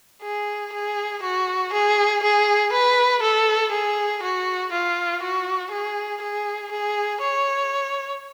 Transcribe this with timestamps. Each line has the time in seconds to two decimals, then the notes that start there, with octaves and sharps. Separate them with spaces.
0.22 G#4
0.73 G#4
1.23 F#4
1.72 G#4
2.22 G#4
2.72 B4
3.22 A4
3.71 G#4
4.22 F#4
4.72 F4
5.22 F#4
5.71 G#4
6.22 G#4
6.71 G#4
7.21 C#5